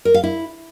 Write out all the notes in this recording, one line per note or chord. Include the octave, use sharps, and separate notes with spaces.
A#4
F5
E4